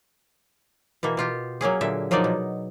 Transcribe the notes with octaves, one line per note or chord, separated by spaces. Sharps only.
B2 E3 A#3
B2 F4 G4
F#3 A#3 C#4 G#4
A#2 D3 E5
F3 F#3 A#3 D#4 D5
B2